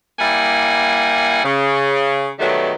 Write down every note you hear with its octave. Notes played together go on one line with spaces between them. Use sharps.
G3 A#3 E4 F#5 G#5
C#3
B2 D#3 F#3 G3 A3